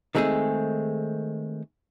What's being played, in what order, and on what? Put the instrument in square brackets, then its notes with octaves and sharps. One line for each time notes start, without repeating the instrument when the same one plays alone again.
[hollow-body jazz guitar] D#3 G#3 A3 C4 G#4